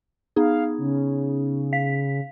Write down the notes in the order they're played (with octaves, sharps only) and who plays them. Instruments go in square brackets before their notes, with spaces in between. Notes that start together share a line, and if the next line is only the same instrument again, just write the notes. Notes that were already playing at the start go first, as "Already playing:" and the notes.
[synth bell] B3 D#4 G#4 [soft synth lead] F5
[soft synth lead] C#3
[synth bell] F5 B6